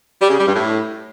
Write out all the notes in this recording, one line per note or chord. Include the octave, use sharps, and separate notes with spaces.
G3
C#3
G3
G2
A2